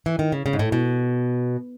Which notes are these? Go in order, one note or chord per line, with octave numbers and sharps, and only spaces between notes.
E3
D#3
C#3
C#3
G#2
A2
B2